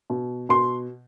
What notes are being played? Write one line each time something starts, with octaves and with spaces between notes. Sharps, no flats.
B2
B2 C6